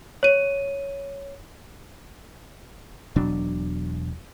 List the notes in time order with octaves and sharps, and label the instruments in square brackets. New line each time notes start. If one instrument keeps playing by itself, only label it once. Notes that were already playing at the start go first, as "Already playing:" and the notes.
[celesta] C#5 D#7
[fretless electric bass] E1 B2 F#3 D4